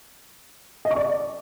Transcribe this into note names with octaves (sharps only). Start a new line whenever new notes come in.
D#5
C#6
D5